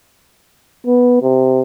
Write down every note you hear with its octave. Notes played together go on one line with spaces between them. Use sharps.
B3
C3